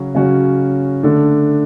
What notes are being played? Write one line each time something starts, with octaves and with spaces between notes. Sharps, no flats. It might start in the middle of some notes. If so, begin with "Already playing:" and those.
Already playing: C#3 F#3 C#4 F#4
C#3 F#3 C#4 F#4
D3 A3 D4 A4